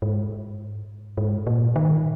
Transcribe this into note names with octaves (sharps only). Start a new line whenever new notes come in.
G#2
G#2
A#2
D#3